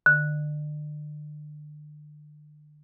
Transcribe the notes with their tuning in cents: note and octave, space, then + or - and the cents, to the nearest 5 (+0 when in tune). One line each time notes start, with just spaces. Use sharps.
D3 +35